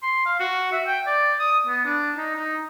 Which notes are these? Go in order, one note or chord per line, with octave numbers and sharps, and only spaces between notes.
C6
F5
F#4
E5
G5
D5
D#6
B3
D4
D#4
D#4